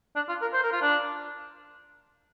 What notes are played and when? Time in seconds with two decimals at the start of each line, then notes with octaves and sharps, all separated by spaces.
0.15 D4
0.29 F4
0.42 A#4
0.53 C5
0.63 A#4
0.72 F4
0.82 D4